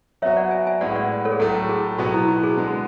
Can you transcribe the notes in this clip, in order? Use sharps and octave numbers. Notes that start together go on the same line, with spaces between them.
F#3 B3 F#4 C#5 E5
D5 F#5
E5 G#5
E5 G#5
A2 G#3 B3 D5 F#5
D5 F#5
A4 C#5
G#4
A2 F#3 A3 A4
G#4
B2 F#3 B3 F#4
E4
F#4
G#4
D3 G#3 B3